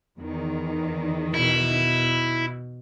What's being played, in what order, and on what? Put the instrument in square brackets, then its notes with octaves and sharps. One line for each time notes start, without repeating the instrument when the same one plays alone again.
[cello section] E2 D#3
[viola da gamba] B2 [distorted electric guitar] E4